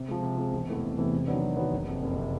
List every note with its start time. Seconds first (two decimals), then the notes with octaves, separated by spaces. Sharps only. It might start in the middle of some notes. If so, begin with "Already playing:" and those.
Already playing: C3
0.08 F3 G#3
0.23 C3
0.37 F3 G#3
0.53 E1
0.68 E2 C3 E3 A3
0.83 E1
0.98 E2 C3 E3 A3
1.13 C3
1.27 D#3 F#3 B3 D4
1.42 C3
1.57 D#3 F#3 B3 D4
1.73 F#1
1.87 F2 C3
2.02 F#1
2.17 C3